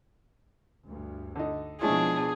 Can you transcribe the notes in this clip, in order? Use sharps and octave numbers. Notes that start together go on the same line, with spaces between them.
D2 G2
D3 D#4
B2 F3 G#3 C#4 D4 E4 G#4